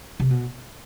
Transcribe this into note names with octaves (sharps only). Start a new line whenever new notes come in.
C3
B2